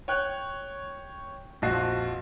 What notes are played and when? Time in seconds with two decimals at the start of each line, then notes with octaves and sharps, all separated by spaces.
0.08 C#5 G5 F#6
1.62 A#1 F2 F3 F#4 D#5 C7